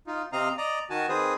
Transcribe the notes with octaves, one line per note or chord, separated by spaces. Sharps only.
D#4 F4
C3 C4 D#5 F5 A#5
D5 D#5 A#5
D#3 F#4 G#5 A5
D#3 C4 G#4 B4 C5 D#6